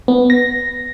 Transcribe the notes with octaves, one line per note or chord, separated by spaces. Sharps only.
B3
A#6